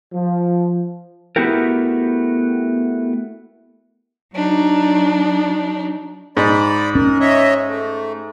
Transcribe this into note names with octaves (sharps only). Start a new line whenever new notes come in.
F3
A3 B3 E4 F#4 G4 A#4
F#3 D4 D#4
G#2 D5 B5
C#4 A#4
C#5 D#5 E5
A3